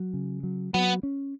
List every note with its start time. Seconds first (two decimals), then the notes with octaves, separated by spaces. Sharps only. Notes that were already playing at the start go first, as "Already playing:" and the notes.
Already playing: F#3
0.14 C#3
0.43 F#3
0.74 F#3 B3
1.03 C#4